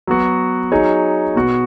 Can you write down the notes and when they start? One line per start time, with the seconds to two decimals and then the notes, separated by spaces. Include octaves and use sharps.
0.07 F#3 B3 F#4
0.71 F#3 D#4 G#4 C#5
1.35 B2 B3 F#4